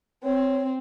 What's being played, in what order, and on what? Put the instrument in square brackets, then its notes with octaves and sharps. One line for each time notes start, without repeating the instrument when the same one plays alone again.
[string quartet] C4 [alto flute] C#5